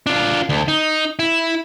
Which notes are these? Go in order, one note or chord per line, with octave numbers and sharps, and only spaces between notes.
D4 F4
D2
D#4
E4